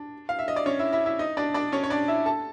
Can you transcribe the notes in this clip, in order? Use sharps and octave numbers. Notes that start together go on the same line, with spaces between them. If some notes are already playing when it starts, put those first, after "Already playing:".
Already playing: D4
F5
E5
D#5
D5
C#4 C#5
E4 E5
E4 E5
E4 E5
D#4 D#5
D4 D5
D4 D5
C#4 C#5
C#5
D4 D5
E4 E5
A4 A5